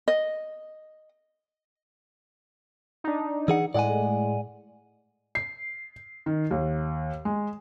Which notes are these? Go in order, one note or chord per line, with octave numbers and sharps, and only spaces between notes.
D#5
D4 D#4
E3 G#4 F#5
A2 G#3 D5 F#5 G#5
C7
D#3
D#2
G#3